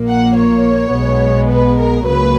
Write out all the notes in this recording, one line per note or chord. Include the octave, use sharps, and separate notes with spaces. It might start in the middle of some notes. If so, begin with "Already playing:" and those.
Already playing: A#1 A#2 A#3
F#5
C#5
B1 B2 G#3 B3
B4
A#4
C#2 C#3 F#3 A#3 B4